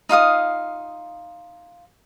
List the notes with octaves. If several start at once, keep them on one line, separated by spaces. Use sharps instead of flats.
D#4 F4 F5 D#6